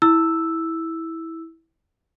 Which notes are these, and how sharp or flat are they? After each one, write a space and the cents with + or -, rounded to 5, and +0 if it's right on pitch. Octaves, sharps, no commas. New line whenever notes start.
E4 -15 E6 +0